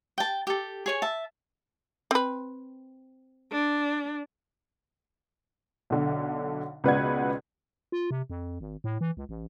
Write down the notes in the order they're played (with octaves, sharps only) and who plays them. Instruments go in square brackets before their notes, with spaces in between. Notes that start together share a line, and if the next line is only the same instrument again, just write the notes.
[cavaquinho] G5 A5
G4 A4
G#4 C#5 G#5
E5 A5
[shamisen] C4 B4
[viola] D4
[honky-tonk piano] B1 D3
C#2 B2 B4 D5 F#5 G#6
[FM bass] F4
C3
F2
G#1
A2
E3
C#2
A1